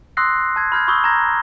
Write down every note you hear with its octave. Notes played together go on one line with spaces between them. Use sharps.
C6 D#6 E6 F#6 A#6 C7
A5 G#6
B5 F6 G6 G#6
B5 C#6 D#6 E6 G6 G7
A#5 G#6 A#6